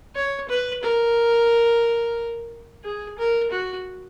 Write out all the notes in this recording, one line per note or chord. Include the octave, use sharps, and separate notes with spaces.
C#5
B4
A#4
G#4
A#4
F#4